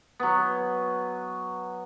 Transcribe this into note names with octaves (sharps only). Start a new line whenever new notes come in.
F#3 B3